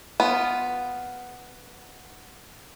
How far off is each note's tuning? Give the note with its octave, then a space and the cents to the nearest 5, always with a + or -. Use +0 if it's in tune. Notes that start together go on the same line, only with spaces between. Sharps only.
B3 +0 F4 +0